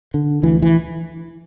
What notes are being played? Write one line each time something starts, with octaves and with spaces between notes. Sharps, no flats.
D3
D2 E3
E3